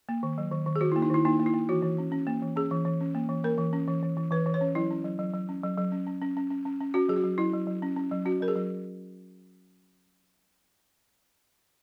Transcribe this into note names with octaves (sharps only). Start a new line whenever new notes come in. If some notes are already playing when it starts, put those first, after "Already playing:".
A#3
D#3
F#3
D#3
D#3
G#4
D#3 F#4
E4
A#3
D#4
D#3 E4
A#3 D#4
A#3
E4
A#3
E3 F#4
E3
C#4
C#4
A#3
E3
C#4 G#4
E3
E3
C#4
A#3
E3
A#3 A#4
E3
C#4
E3
E3
E3
E3 B4
E3
C#5
C#4
F#3 E4
C#4
F#3
F#3
F#3
C#4
F#3
F#3
C#4
C#4
C#4
C#4
C#4
C#4
C#4
C#4 F#4
F#3 G#4
F#4
F#3
F#3 E4
F#3
F#3
C#4
C#4
F#3
C#4 F#4
F#3 A#4
G#4
F#3